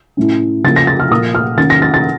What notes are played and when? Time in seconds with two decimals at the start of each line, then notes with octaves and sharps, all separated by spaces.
0.17 A2 A3 C#4
0.64 C#3 F3 A#3 A6
0.76 A#6
0.87 A6
1.00 F6
1.11 A#2 F3 A#3 D#6
1.35 F6
1.57 D#3 A#3 C#4 A6
1.70 A#6
1.82 A6
1.94 A6